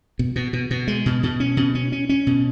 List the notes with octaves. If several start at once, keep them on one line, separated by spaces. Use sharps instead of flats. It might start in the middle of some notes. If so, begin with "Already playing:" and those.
B2
B2
B2
B2
G#3
B2
B2
C#4
B2
C#4
C#4
C#4
B2